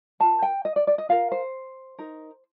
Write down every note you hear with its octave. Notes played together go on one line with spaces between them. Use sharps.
F4 A#4 A5
G5
D#5
D5
D5
D#5
F4 A#4 F5
C5
D#4 A#4